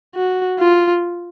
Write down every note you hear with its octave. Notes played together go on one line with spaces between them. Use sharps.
F#4
F4